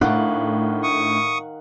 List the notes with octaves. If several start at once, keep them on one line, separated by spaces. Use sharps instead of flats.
A2 D#3 A3 D4 F5 F#5
C#6 D#6